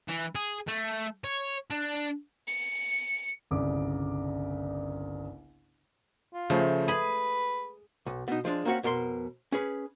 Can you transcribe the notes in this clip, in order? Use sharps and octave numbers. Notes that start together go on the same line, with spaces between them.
E3
G#4
A3
C#5
D4
C#7
G1 C2 C#3 D6
F4
C#3 F3 A3 C5
G#4 B4 B5 D#7
B1
B2 D#4
F3 G#3 D4
A#3 C4 C#4 F#4 F#5
F2 B2 A#4 C#5 C6
C#4 G#4 B4